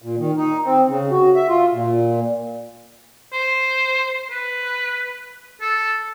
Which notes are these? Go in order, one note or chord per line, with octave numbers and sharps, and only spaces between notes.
A#2
D#3
D#4
C4
C#3
F#4
E5
F4
A#2
C5
B4
A4